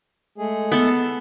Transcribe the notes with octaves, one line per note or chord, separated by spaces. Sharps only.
G#3 A3 G#4
B3 A4